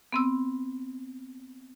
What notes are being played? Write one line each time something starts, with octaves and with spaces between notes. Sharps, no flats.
B3 C4 E6